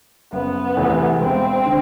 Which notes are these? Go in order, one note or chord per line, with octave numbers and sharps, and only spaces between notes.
F#1 B3
E2 C3 E3 A3
E1 C4
D3